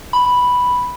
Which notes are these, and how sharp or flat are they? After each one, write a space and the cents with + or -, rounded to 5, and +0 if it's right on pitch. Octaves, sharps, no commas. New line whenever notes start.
B5 +0